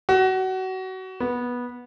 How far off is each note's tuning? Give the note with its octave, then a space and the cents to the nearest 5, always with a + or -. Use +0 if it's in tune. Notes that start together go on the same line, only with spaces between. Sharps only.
F#4 +25
B3 -15